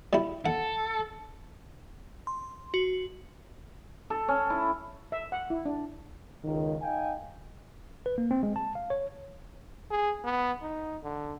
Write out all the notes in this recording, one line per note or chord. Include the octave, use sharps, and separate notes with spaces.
G3 E4
A4 F#5
C6
F#4
A4
C#4
E4
E5
F#5
E4
D4
C#2 D#3
D#4 F5 G5 G#5
B4
A#3
C4
G#3
A5
F5
C#5
G#4
B3
D#4
D3